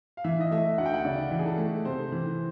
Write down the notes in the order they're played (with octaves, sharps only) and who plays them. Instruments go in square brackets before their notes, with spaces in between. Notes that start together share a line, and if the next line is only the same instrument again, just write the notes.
[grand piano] F5
[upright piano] E3 [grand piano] E5
[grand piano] D#5
[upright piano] A3 [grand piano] E5
[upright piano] D2 [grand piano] F#5
[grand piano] G5
F#5
[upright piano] C#3 [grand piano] D5
[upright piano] E3
[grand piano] G#4
A4
[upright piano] A3
[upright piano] C3 [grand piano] C5
[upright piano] E3